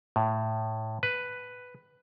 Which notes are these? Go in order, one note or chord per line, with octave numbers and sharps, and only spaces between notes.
A2
B4